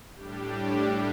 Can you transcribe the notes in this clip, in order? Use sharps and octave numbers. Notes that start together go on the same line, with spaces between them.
A2 G3 D4 G4